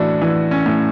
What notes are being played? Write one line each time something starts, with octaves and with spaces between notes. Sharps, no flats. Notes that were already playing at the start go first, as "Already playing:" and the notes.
Already playing: A2 E3 D4 F#4
E3
C#4
A2